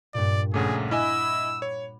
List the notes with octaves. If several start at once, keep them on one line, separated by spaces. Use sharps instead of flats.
G2 A#2 D5
A#1 C#3 A3 G#4 F#5 A#5 D6
E4 D#5 G#5 B5 D6 E6 F#6
C#5